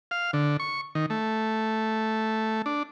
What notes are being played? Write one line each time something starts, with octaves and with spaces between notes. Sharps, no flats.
F5
D3
C#6
D#3
A3
D4